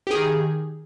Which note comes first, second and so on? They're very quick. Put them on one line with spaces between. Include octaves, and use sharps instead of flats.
G4 G#4 D#3